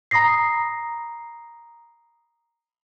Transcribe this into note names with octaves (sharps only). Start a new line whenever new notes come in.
A#5 B5 D#6 A#6 C7